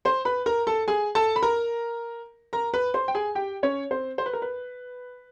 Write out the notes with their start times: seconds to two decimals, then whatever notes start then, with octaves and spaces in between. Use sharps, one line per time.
0.05 C5 C6
0.25 B4 B5
0.46 A#4 A#5
0.67 A4 A5
0.88 G#4 G#5
1.15 A4 A5
1.36 B5
1.42 A#4 A#5
2.53 A#4 A#5
2.74 B4 B5
2.94 C5 C6
3.08 G5
3.15 G#4 G#5
3.35 G4 G5
3.63 C#4 C#5
3.91 C4 C5
4.18 C5
4.26 B4
4.33 A#4
4.42 B4